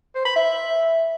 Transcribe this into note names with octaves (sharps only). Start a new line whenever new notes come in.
C5
B5
E5